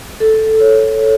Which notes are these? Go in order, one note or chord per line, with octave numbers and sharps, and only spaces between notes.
A4
C#5